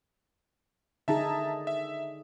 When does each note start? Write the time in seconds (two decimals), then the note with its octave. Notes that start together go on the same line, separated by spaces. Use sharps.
1.08 D3 D#4 G#4 E5 A5 A#5
1.67 E5